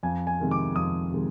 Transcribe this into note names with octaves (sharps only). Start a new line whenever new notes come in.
F2 G#5
G#5
C3 D#3 G#3
D6
F2 D#6
C3 D#3 G#3